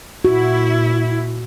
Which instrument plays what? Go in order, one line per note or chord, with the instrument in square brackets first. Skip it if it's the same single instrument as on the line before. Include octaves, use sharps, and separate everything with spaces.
[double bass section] A#2 [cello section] E4 [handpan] F#4